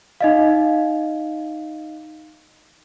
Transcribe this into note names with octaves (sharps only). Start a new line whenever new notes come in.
D#4 D#5 F5